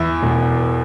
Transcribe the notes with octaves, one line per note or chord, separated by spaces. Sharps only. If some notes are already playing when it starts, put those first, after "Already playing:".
Already playing: E2 E4
E1